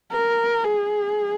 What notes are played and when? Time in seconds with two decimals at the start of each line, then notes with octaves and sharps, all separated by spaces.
0.12 A#4
0.64 G#4